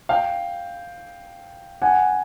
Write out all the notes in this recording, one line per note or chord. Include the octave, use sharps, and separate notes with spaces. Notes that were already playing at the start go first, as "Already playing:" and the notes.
F5 G5
F#5 G#5